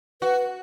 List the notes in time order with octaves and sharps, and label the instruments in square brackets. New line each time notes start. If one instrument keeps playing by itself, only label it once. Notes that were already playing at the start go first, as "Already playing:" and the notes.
[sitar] F#4 [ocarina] B4